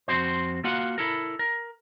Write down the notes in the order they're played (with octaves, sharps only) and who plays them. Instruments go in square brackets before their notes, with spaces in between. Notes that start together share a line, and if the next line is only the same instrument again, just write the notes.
[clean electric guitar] F2 C4 F#4 C5
A#3 F4 F#4 F5 F#5
E4 A4 A#4
A#4